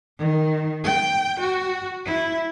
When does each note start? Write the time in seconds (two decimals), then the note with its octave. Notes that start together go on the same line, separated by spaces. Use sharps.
0.19 D#3
0.84 G5
1.40 F#4
2.06 E4